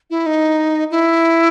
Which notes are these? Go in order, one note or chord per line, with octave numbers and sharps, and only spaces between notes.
E4
D#4
E4